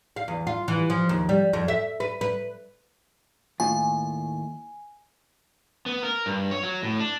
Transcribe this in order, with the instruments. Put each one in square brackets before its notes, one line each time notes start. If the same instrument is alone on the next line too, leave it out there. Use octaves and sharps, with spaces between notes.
[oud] F5
E2
F4
E3
F3
D#2
G3
F2
E5
B4
B4
[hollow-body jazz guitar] D#2 A2 F4 [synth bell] G#5
[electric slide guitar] B3
A#4
G2
C#5
F#3
A2
D4